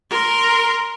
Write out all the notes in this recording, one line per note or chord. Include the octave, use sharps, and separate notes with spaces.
A#4 C6